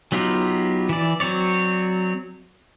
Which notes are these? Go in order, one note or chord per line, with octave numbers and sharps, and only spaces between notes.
F#3 B3 D#4 F4 G4
E3 D5
F#3 C4 C#5 D5